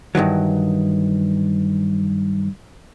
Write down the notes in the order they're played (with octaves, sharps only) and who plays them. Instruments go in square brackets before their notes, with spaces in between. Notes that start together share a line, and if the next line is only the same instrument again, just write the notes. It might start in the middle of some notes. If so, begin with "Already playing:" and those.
[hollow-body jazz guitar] G2 D#3 E3 F#3